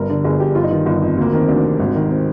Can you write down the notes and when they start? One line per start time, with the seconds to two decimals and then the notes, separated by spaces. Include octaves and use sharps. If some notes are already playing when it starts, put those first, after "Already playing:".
Already playing: G1 G2 A#4
0.10 D3
0.24 G1 G#4
0.40 G2 G4
0.55 G1 F4
0.64 D#4
0.71 D#3 F4
0.86 G1
1.02 F2
1.17 D2 A#3
1.33 D#3 C4
1.48 D2 D4
1.64 C3
1.79 G#1
1.95 D#3
2.10 C4